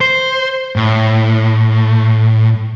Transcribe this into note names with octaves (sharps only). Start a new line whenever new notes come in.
C5
A2